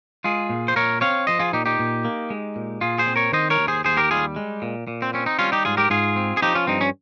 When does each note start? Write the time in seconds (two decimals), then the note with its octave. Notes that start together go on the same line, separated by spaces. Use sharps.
0.24 G#3 F4 G#4
0.50 A#2
0.68 C5
0.76 A#2 A#4 C#5
1.01 C4 C#5 F5
1.27 F3 C5 D#5
1.39 F4 G#4
1.53 A#2 D#4 G4
1.66 D#4 G4
1.79 A#2
2.05 A#3
2.30 G#3
2.56 A#2
2.81 A#2 F4 G#4
2.98 G#4 C5
3.07 C4
3.16 A#4 C#5
3.33 D#3 C5 D#5
3.50 A#4 C#5
3.59 D#2
3.68 G#4 C5
3.85 D#2 G#4 C5
3.97 G4 A#4
4.11 G3 F4 G#4
4.36 G#3
4.62 A#2
4.88 A#2
5.02 C4
5.14 C4 C#4
5.26 D#4
5.39 G3 C#4 F4
5.52 D#4 G4
5.65 G#2 F4 G#4
5.77 G4 A#4
5.90 G#2 F4 G#4
6.16 C4
6.37 G#4
6.42 F3 D#4 G4
6.55 C#4 F4
6.67 G2 C4 D#4
6.81 C#4